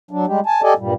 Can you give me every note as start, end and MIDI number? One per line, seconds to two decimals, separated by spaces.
0.11 0.25 54
0.11 0.25 62
0.26 0.40 55
0.26 0.40 56
0.26 0.40 67
0.46 0.62 80
0.46 0.62 81
0.62 0.74 67
0.62 0.74 69
0.62 0.74 74
0.62 0.74 75
0.62 0.74 80
0.78 0.94 43
0.78 0.94 46
0.78 0.94 55